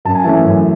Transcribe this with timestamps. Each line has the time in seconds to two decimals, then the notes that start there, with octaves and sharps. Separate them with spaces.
0.05 F#2 A5
0.15 G#5
0.24 E3 A3 C#4 A5
0.45 F#2